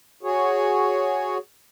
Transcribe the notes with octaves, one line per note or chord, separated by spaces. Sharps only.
F#4 G#4 C#5